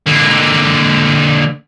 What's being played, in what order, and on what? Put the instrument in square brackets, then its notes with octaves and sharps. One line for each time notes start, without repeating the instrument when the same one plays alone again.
[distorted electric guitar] D3 A#3